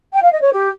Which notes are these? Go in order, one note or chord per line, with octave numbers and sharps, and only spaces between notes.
G5
F5
D#5
C#5
G4